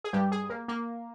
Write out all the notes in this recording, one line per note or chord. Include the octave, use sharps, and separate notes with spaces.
G#4
G2 G3 G4
G#4
A#3
A#3